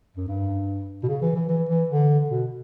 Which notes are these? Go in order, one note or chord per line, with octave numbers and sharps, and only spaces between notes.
F#2
G2
B2
C#3
E3
E3
E3
E3
D3
B2